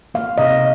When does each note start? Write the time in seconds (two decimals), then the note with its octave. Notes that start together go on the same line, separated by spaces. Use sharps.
0.14 A#3 F5
0.38 C3 D#5